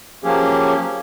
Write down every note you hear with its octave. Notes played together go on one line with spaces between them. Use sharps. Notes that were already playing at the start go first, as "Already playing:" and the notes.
F3 F#3 A#3 C#4 G4 G#4